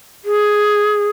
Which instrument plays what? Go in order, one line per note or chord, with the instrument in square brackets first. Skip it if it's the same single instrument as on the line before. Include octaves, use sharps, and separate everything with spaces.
[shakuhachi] G#4